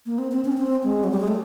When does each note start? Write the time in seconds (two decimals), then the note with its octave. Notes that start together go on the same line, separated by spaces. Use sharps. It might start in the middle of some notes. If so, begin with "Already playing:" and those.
0.06 A#3
0.18 C4
0.32 C4
0.45 C#4
0.58 C4
0.84 G#3
1.04 F#3
1.12 G3
1.20 G#3
1.28 A3